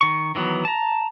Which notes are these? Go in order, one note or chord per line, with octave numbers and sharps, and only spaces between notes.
D#3 C#6
D#3 E3 F#3 B3
A5 A#5